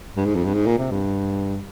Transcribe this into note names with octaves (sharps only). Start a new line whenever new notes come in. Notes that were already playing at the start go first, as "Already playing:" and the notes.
G2
G#2
F2
G2
G#2
A#2
C3
G2